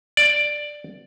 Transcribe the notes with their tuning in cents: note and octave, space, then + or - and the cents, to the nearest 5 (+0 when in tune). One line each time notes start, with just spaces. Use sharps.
D5 +5